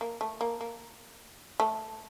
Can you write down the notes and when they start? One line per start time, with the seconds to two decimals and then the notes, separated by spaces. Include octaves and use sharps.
0.01 A#3
0.21 A3
0.41 A#3
0.61 A#3
1.60 A3